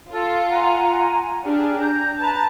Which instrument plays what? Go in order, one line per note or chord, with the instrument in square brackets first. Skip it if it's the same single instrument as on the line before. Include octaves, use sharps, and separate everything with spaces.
[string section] F4 [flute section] A4
[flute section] F#5 G#5 A#5
[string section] D4 G4 G#4 [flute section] F6
[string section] A#5 [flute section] G6
[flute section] B4 A#5 [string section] A5